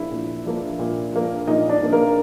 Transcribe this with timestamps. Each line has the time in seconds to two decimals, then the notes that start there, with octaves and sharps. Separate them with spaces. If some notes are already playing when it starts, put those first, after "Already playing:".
Already playing: A#2 F3 A#3 D4 E4 E5
0.11 A#2
0.46 F3 A#3 D4
0.79 A#2
1.13 F3 A#3 D4
1.47 A#2 D#4 D#5
1.69 D4 D5
1.80 F3 A#3 D4
1.93 A#3 A#4